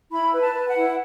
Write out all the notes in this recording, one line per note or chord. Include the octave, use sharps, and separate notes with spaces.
E4 B5
B4
A5
B4
F#5
E4